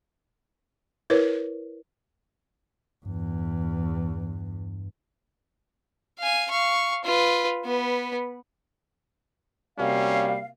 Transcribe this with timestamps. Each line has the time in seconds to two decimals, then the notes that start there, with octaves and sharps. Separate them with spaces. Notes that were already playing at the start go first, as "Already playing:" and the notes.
1.10 E4 A#4 B4 C#5
3.05 E2 G2
6.19 F5 G#5
6.51 F5 C#6
7.05 F4 B4
7.65 B3 B4
9.79 C3 G3 A#3 C#4 F#4 F5